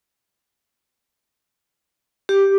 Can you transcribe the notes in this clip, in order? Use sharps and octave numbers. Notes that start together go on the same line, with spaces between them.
G4